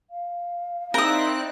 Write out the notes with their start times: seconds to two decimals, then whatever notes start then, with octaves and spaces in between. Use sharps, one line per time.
0.10 F5
0.94 C4 D#4 E4 A#4 D5 D#6 F#6